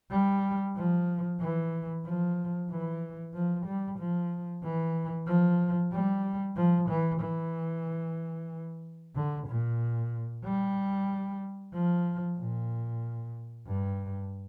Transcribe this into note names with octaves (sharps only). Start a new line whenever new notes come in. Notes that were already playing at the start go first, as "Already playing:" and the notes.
G3
F3
E3
F3
E3
F3
G3
F3
E3
F3
G3
F3
E3
E3
D3
A#2
G3
F3
A#2
G2